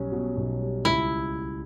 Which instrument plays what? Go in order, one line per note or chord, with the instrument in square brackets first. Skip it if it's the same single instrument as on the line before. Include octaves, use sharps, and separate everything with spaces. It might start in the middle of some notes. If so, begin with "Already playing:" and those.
Already playing: [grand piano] B1 G3 C#4
B2
B1
G3
[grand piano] C#2 [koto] E4